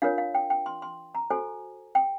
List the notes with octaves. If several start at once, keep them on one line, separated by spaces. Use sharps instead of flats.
D4 F4 A#4 C#5 F5
F5
G5
G5
C6
C6
A#5
F#4 A4 C5 G#5
G5